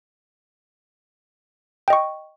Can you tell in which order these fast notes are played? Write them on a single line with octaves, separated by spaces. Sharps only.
G5 D#5 C#6